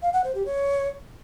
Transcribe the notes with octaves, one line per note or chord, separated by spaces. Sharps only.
F5
F#5
C5
G4
C#5